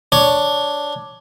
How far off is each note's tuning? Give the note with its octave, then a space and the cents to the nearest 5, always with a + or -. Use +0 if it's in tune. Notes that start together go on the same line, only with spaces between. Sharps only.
D4 +0 C#5 +10